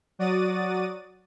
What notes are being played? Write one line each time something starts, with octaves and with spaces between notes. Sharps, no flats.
F#3 F#4 D5 D#6 A6 D#7